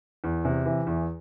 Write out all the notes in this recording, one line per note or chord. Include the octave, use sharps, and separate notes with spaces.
E2
C3
E3
E2